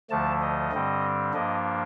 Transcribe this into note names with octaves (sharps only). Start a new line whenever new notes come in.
D2 D3 F3 A3 A5
D#5
G2 D3 G3 C4
G2 F3 A#3 D4 D#5